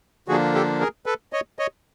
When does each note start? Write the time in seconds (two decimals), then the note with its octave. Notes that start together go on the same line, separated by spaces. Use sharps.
0.28 D3 F3 A#3 D4 F#4 G#4
0.54 G4 A4
0.80 G#4 A#4
1.06 A4 B4
1.33 C#5 D#5
1.59 C#5 D#5